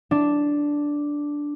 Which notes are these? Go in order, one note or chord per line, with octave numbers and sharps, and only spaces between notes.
D4